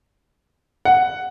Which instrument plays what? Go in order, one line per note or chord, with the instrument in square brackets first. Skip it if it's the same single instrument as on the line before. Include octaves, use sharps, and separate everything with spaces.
[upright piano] F#5